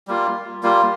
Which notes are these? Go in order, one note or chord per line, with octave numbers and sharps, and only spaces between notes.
G3 A#3 F4
G3 A#3 F4